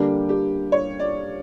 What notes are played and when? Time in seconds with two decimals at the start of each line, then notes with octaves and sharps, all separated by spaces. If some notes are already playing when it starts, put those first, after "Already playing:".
Already playing: D3 G3 A#3 D4 G4
0.29 G4
0.72 C#5
0.99 D5